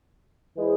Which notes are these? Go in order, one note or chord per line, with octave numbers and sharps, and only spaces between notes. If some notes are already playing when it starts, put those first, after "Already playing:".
E3 G#3 E4 G#4 C5